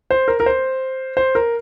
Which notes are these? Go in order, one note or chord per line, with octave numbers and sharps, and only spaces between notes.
C5
A#4
A#4
C5
C5
A#4